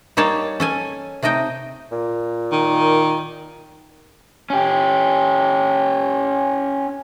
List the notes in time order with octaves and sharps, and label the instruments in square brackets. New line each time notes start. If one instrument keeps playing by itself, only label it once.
[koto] G3 A#3 D#4 C#5 A5
C#4 A4 G#5
C3 A3 D#4 D#5 G5
[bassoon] A#2
[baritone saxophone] D#3
[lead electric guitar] C#4 G4